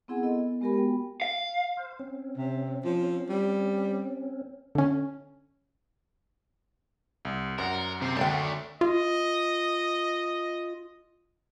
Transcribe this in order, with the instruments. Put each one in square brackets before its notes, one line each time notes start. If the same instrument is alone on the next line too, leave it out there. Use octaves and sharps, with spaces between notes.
[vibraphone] B3 C4 E4 G#4 F#5 G#5
B3 E4 A4 D#5
B3
G#3 B3 G4 A#4 G#5 B5
B3 F#4 G5
[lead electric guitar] F5
[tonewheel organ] C5 F5
C4 C#4
[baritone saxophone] C3
F3
G3
[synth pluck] D3 C#4
[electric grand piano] C2
[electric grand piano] F#2 F#5 [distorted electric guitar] A#4 [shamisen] C5 D5
[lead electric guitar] C3 [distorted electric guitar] C4 C5
[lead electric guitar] D2 G#2 [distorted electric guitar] A3 D4 [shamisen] C5 C#5 G5
[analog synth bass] F4 [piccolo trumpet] D#5